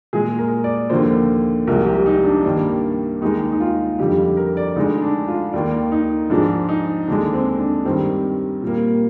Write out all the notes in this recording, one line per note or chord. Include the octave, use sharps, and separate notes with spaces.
A#2 G#3 G#4
A#4
D5
D#2 D3 F3 A#3 C5
C2 C3 F3 G#3 A#4
G4
D#4
D4
G2 D#3 G3 A#3
D#2 D#3 G#3 D#4
D#4
F4
F2 D3 G3 G4
A#4
D5
D2 D3 G#3 D#4
D4
F4
D#2 D#3 A#3 D5
D#4
G#2 F3 G#3 D4
D#4
D#2 D3 G#3 D4
C4
D4
G2 D#3 G3 C4
A#2 G3 A#3